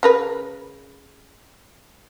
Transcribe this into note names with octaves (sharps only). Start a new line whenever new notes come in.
C#3 A#4 B4